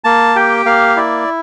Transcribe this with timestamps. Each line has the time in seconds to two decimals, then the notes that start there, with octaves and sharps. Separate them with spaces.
0.04 A#3 A5
0.36 G4 G5
0.66 A#3 F5
0.96 E4 D5